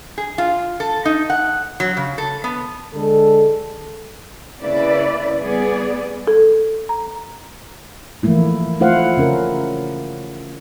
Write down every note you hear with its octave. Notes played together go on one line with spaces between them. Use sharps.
G#4
F4
A4
D#4
F#5
F#3
C#3
A4
B3
D3 G#3 A4
C#3 A#3 E4 B4 D5
G3 B3 G#4 D5
A4
A#5
E3 F3 A3 A#3 E4
A3 E4 F4 C5 F5 F#5
C#3 C#4 A#4